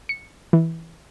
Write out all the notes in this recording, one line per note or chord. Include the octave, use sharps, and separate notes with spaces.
C#7
E3